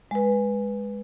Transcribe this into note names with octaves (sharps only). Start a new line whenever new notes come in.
G#3 B4